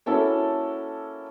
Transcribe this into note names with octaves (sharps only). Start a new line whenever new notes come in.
A#3 C#4 E4 F#4 A4